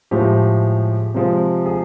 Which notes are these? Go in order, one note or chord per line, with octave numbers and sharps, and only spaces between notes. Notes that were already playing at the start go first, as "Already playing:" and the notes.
A2 F3 G#3 G4
C3 F3 G#3
G#4